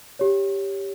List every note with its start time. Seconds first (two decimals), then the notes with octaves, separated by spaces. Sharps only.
0.19 G4 C#5